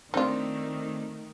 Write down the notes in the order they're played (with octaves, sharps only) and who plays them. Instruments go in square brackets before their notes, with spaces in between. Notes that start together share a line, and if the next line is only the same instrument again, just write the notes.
[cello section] D#3 A3 [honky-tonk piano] C4 D4 [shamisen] D#4 F4